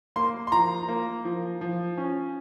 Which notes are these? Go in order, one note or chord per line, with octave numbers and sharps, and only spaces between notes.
A#3 C6
C6
F3 A#5
A#3
F3
F3
C#4